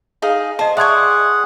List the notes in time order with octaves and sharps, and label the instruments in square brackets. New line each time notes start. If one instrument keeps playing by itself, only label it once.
[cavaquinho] D#4 G#4 F5
[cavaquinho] C5 [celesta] D#5 A5
[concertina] G#4 F#5 [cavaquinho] D5 C#6 [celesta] E5 C6 G#6